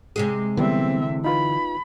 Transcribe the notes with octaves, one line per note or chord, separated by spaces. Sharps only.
C3 G#3 G#4
D3 E3 G3 B3 C4 E5
D#4 F4 B4 B5